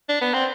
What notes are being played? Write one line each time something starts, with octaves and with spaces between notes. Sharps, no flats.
D4
B3
C4